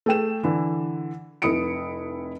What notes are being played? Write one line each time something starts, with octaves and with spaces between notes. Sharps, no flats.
A3 G#4 G5 E7
D3 E3
F1 E4 D#6 C#7 D7